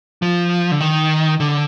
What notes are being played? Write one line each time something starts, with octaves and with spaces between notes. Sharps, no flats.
F3
D3
D#3
D3